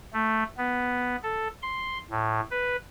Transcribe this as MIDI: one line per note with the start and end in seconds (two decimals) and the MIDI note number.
0.13 0.43 57
0.57 1.16 59
1.23 1.48 69
1.63 1.98 84
2.10 2.40 45
2.51 2.76 71